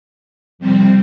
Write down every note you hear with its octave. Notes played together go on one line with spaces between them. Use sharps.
F2 C3 G3 C4